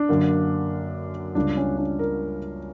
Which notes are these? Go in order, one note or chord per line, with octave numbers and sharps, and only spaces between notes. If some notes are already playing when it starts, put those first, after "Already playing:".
Already playing: D4
F#2 D3 A#3
C#2 C#3 G3 A#3 D4
C#4
D4
A#4